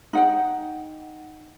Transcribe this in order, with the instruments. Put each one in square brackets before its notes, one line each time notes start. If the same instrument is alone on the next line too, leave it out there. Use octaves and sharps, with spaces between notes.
[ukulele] D#4 F#5 G5